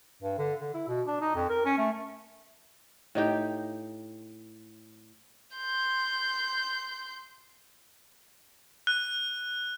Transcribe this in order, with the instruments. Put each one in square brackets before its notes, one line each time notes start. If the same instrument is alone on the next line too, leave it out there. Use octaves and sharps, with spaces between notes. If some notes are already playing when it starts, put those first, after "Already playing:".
[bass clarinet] G2
D3
D3
E4
B2
D4
D#4
F2
A#4
C#4
A3
[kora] A2 D#4 G4
[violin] C6 G6
[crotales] F#6